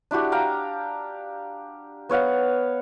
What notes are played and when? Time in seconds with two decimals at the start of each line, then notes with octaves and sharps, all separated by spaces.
0.11 D4 E4 F#4 G4
0.32 F5 G5 A#5
2.09 B3 C#5 F5 F#5